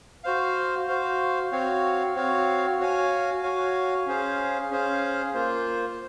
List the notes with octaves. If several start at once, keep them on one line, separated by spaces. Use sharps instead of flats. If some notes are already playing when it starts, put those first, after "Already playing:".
F#4 C5 F5
F#4 C5 F5
C4 F#4 C#5 F5
C4 F#4 C#5 F5
F#4 C#5 F5 G#5
F#4 C#5 F5 G#5
C#4 G#4 C5 F5
C#4 G#4 C5 F5
A#3 F4 C5